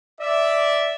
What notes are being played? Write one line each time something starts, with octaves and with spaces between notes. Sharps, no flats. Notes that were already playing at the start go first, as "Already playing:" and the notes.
D5 E5